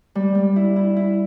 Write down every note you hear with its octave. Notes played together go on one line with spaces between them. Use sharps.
G3
G3
E4
E4
E4